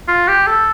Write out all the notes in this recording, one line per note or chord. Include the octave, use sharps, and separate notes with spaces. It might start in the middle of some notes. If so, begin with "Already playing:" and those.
F4
G4
A4